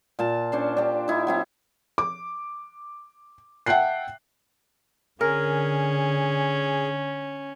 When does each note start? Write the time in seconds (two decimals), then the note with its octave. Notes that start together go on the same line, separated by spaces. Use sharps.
0.19 A#2 F4 A5
0.52 C#4 D4 C5
0.77 D4 G4
1.08 D#4 E4
1.27 F#3 C4 E4
1.98 D6
3.66 E5 F#5 G5 A5 F#6 C7
5.21 D3 C#4 G#4 A#4